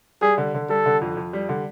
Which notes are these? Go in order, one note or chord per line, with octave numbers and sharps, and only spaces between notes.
G3 G#4
D3
D3
G3 A4
D3
F2
F2
G3
D3